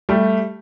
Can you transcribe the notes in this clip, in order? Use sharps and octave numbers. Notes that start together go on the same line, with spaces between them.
G3 A3